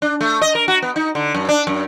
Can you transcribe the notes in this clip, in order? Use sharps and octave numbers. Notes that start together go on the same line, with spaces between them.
D4
A3
D#5
A#4
F#4
B3
D#4
D3
F#2
D4
F#2